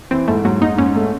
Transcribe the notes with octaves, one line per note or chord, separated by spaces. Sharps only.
E3 C4
G#2 A3
G#2 F#3
G#2 D#4
G#2 C#4
A3